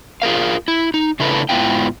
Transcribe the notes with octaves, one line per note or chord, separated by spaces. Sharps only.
F4 G#4 A#4 F5
E4
D#4
C#3 A3 D4 E4 A4 B4
G#2 A#3 B3 E4 F4 G5